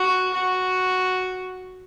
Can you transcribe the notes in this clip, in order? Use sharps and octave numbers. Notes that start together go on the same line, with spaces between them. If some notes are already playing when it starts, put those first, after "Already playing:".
Already playing: F#4
F#4